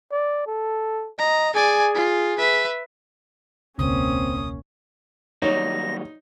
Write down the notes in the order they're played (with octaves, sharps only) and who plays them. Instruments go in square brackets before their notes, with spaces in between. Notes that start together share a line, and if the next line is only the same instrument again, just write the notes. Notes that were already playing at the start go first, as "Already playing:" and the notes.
[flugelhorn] D5
A4
[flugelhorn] D#5 [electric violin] A#5
[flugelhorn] G#4 [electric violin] D5 G#5
[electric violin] F4
B4 E5
[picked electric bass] E1 C#2 [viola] A#3 C#4 [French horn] C4 [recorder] D#6
[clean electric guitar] D#2 F#3 G3 [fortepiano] D#4 [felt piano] C#5 [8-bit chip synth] A#6